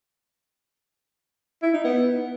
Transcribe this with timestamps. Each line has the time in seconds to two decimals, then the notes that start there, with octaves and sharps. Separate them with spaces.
1.63 E4
1.73 D#4
1.84 B3